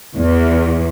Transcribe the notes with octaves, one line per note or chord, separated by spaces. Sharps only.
E2